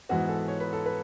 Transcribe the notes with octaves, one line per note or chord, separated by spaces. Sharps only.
G#2 E3 G#3 B3 F#4
A4
C#5
B4
A4
B4